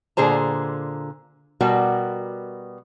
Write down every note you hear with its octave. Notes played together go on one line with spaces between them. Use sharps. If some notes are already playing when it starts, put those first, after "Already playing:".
A#2 D3 G#4 C5 A#5
B2 G3 F#4 A#4